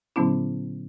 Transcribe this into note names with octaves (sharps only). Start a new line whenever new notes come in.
A#2 D3 F#3 B3 C#4 E4